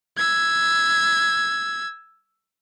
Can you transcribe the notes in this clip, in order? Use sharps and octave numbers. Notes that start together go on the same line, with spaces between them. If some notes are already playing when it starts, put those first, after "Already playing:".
E6 G#6